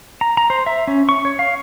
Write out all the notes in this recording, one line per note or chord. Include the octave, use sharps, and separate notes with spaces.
A#5
A#5
C5
E5
C#4
C#6
C#5
F5